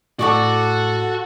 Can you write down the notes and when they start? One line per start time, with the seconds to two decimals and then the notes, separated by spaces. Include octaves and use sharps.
0.19 A2 F#4 A4 D5 F#5 C#6 D6